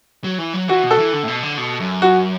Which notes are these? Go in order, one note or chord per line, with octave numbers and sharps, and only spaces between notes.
F#3
E3
F#3
E3 F#4
B2
A4
E3
D3
A2
B2
D3
B2
F#2
F#4